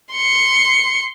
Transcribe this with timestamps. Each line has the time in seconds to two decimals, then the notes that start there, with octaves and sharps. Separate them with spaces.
0.13 C6 C#7